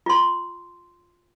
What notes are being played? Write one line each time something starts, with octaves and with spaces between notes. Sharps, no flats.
F4 C6